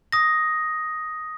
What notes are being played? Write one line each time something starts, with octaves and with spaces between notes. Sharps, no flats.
D#6 A#6